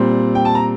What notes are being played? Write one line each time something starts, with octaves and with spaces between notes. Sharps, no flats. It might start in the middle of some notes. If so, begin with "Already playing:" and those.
Already playing: A#2 G3 C4
G5
A5
A#5